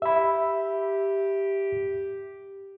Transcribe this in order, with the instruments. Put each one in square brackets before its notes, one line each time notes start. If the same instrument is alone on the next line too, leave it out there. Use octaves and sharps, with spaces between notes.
[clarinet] G4 [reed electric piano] E5 B5